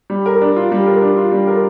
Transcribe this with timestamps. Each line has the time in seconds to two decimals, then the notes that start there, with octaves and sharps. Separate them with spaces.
0.10 G3
0.26 A#4
0.41 D4
0.56 F4
0.72 G3
0.86 A#4
1.01 D4
1.16 F4
1.32 G3
1.47 A#4